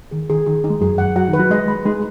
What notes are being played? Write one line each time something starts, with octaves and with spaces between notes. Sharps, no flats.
D#3 G#4
D#3 G#4
D#3 G#4
D#4
G#3
F#2 F#3 G#4
F#5
F#3 F#4 F#5
D#3 D#4
B4
F#3 F#4
G#3 G#4 D#5
B5
G#3 D#4 G#4